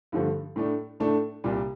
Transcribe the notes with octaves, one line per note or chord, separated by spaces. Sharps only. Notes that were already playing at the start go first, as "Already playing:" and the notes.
G2 D3 F3 A3
A2 A3 D4
A2 A3 D4
C2 A#2 G3